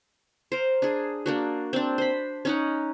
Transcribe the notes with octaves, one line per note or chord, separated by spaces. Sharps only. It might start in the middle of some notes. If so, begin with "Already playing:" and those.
A#4 C5
D4 G#4
A#3 D4 F#4
C4 D4
C5 B5
C#4 D#4 F#5